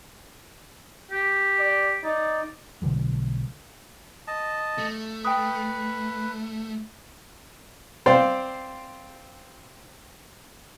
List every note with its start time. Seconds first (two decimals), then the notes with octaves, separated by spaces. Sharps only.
1.11 G4
1.60 D5
2.04 D#4 D5
2.82 B1 D3 F3 G#3
4.27 D#5 A5
4.78 A3
5.25 B4 G5 D#6
8.06 C4 C5 D5 F5 G5